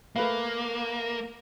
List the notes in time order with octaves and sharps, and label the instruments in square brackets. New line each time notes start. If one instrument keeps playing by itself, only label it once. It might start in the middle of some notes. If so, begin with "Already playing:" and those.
[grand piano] A3 B4 F5 [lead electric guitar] A#3